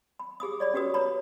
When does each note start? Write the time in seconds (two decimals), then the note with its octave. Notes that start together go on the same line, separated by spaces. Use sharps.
0.19 B5
0.40 G4 G#4 B5 D#6
0.60 C#5 D5 B5
0.74 C#4 F#4 G4 B4 D#6
0.94 B4 C#5 A#5 B5